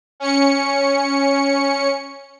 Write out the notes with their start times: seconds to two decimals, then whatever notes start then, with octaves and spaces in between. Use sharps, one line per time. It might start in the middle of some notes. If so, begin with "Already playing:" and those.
0.20 C#4 C#7